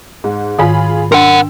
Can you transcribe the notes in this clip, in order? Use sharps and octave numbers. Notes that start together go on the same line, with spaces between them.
G#2
G#2 D#3 F4 G#4 B5
D4 A#4 F#5 G5 E6